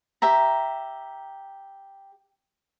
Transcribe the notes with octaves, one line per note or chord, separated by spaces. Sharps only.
G4 E5 A#5